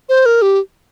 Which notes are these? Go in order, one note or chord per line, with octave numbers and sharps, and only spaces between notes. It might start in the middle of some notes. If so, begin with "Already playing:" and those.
C5
A#4
G4